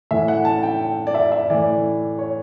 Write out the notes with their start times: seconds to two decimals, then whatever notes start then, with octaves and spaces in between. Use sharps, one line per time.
0.11 A2 E3 E5
0.28 F#5
0.45 A5
0.63 G5
1.07 D5
1.14 E5
1.32 E5
1.50 A2 E3 D5
2.19 C#5